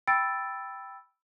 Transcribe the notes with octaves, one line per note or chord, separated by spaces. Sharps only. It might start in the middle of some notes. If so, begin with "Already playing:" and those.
G5 B5 E6 A6 D7